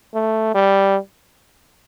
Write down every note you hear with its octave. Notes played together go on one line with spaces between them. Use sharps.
A3
G3